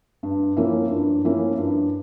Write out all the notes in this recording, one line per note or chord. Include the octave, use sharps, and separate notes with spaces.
G2
F3 A#3 C#4 E4
G2
F3 A#3 C#4 E4
G2